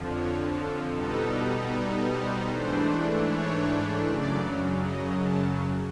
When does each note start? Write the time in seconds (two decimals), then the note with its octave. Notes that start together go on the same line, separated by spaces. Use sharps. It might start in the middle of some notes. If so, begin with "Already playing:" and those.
Already playing: F2 D3 F3
0.14 C#5
0.53 A4
0.92 B2 G3 B3 D#4 A4
1.71 A4
2.09 C5
2.49 G#2 E3 A3 D4 C5
3.27 C#5
4.05 F#2 C#3 F#3 D5
4.84 D#5
5.22 A5